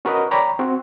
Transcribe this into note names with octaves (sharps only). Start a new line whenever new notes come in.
C#4 F#4 A#4 B4 D#5
C#5 D5 G5 A#5 B5
C4 F#4